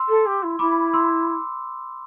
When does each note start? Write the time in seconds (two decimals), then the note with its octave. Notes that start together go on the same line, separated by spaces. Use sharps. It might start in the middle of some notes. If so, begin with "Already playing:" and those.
Already playing: C6 E6
0.08 A4
0.26 G4
0.42 E4
0.59 E4 B5 D6
0.94 C6 E6